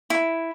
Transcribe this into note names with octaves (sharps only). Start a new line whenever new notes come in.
E4